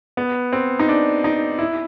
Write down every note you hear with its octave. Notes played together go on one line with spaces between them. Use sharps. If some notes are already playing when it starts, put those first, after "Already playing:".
B3
C4
D#4
D4
D#4
E4